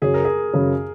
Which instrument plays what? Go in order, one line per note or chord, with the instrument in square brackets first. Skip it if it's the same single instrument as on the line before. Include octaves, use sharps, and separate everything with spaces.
[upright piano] F#2 C#3 F#3 C#4 [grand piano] G#4
[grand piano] A#4
G#4
[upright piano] F#2 C#3 F#3 C#4